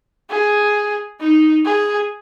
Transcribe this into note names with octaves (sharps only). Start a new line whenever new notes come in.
G#4
D#4
G#4